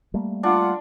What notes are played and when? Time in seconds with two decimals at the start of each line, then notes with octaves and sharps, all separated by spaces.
0.14 G3 A3 A#3
0.43 D4 F4 F#5